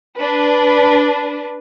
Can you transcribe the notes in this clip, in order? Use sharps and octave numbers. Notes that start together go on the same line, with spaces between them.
D4 B4